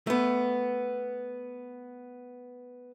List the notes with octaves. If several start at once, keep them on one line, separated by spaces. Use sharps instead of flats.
A3 B3